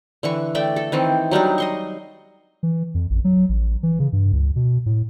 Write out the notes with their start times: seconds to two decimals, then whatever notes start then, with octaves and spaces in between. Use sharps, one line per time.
0.23 D3 E3 C#6
0.55 A3 D5 E5 G5
0.76 A4
0.92 D#3 E3 C4
1.31 F#3 G3 D4 D#4
1.58 D#5 C6 C#6
2.63 E3
2.94 F2
3.10 A1
3.24 F#3
3.49 A1
3.83 E3
3.99 C#3
4.13 G2
4.33 C#2
4.56 B2
4.86 A2